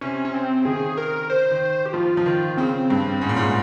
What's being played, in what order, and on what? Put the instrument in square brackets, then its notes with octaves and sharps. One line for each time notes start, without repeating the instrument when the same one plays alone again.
[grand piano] C3 [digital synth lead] C#4
[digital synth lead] C#4
C4
[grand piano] C#3
[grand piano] D#3 [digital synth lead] G#4
[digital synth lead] A#4
C5
[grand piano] D#3
[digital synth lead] G4
[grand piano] F3 [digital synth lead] F4
[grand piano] F3
D#3
[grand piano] C#3 [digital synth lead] C4
[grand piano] G2
[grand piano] G#2 [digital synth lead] C#4
[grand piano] A#2
G#2